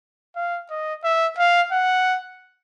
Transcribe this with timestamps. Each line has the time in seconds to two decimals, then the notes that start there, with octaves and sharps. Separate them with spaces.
0.36 F5
0.70 D#5
1.04 E5
1.38 F5
1.71 F#5